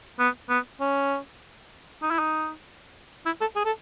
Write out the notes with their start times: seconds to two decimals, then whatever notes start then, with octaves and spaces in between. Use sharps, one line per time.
0.19 B3
0.49 B3
0.80 C#4
2.02 D#4
2.11 E4
2.19 D#4
3.26 E4
3.41 A4
3.56 G#4
3.65 A4